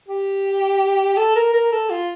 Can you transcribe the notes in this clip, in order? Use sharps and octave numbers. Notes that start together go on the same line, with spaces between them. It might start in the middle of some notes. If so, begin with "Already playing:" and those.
G4
A4
A#4
A#4
A4
F4